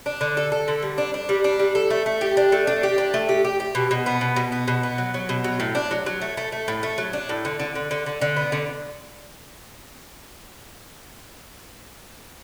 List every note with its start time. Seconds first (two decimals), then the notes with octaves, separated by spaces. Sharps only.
0.06 D4
0.21 D3
0.37 A4
0.52 A4
0.68 D3
0.82 G3
0.98 D4
1.14 D4
1.29 G3
1.44 D4
1.59 G3
1.75 A4
1.90 A3
2.06 A3
2.21 G4
2.37 D4
2.52 A3
2.67 D4
2.83 G4
2.98 D4
3.14 A3
3.29 G4
3.45 G4
3.60 G4
3.75 B2
3.91 B2
4.06 B3
4.21 B2
4.36 B2
4.52 B3
4.68 B2
4.83 B3
4.98 F#3
5.14 F#3
5.29 B2
5.44 F#3
5.60 A2
5.75 D4
5.91 F#3
6.06 F#3
6.22 A3
6.37 A3
6.52 A3
6.68 A2
6.83 A3
6.98 F#3
7.13 D4
7.29 A2
7.45 D3
7.60 D3
7.75 D3
7.91 D3
8.06 D3
8.21 D3
8.37 B3
8.52 D3